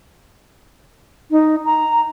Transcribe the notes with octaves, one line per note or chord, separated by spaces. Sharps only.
D#4
A#5